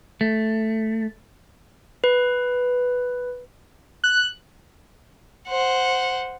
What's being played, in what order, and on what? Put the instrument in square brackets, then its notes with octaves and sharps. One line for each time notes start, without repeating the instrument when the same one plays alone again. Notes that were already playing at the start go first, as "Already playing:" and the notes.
[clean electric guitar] A3
[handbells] B4
[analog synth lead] F#6
[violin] C5 F#5